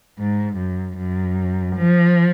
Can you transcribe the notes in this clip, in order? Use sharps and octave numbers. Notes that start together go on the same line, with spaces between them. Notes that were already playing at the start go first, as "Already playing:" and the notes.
G#2
F#2
F#2
F3